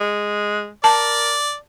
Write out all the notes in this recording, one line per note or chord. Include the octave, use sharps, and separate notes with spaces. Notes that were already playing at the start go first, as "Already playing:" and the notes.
G#3
A#4 D5 A5